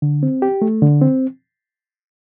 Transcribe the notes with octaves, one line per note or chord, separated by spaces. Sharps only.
D3
C4
G4
A3
D3
C4